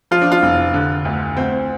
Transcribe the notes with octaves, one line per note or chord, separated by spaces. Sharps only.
F3 F4
D4
F4
F1
D3
D2
D2 C4